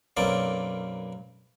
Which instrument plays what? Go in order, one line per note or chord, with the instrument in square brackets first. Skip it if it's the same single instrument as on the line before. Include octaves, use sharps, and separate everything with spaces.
[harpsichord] B1 F#2 A#3 C4 C#4 D5